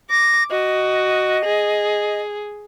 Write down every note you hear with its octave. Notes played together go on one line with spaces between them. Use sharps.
D6 A#6
F#4 D#5
G#4